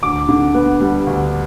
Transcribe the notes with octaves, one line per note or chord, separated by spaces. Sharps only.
D2 D6
D3
B3
G3
D2